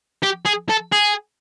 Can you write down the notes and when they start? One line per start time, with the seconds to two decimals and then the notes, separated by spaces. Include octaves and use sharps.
0.23 G4
0.45 G#4
0.69 A4
0.92 G#4